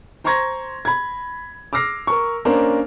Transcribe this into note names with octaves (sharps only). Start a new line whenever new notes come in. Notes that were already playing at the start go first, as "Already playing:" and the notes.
C5 A#5 C6 C#6 G#6 A#6
B5 G#6
D6 E6 F6 A#6 C7
A#4 C#6
A#3 C#4 D4 A#4 C5